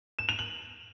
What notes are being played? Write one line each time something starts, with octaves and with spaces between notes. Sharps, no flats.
E7
F7
F#7